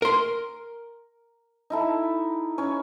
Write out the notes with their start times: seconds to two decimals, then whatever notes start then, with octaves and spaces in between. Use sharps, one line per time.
0.02 A#4 C6
1.70 D#4 E4 A4
2.58 C#4 C#5